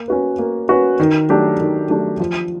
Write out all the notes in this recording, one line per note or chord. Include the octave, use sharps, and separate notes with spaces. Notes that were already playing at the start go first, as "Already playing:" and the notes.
Already playing: A#3
C#4 F#4 B4
A#3
C#4 F#4 B4
D#3
F#3 A3 D4 G4
D#3
F#3 A3 D4 G4
F3